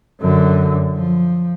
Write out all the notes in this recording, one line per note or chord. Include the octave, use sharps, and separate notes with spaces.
F#2 D3
F3